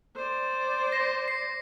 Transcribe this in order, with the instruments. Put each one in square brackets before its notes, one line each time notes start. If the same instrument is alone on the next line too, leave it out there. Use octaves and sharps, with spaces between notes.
[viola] C5 D5
[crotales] A#6 C7
C7